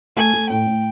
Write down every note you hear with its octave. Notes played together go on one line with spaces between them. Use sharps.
A3 G#5
A3
A2 G5
A2